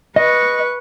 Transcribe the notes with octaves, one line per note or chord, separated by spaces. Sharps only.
B4 D#5 C#6